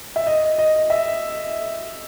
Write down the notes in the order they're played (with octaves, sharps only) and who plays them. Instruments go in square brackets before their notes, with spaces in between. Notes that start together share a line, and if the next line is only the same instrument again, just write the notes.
[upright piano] E5
D#5
D#5
E5